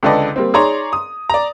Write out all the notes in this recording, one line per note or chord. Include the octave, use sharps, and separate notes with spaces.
C#2 D3 A4 B4 D5 D#5
G3 A#3 C4
D#4 G#4 C#5 D5 A#5 C6
D#6
D5 A#5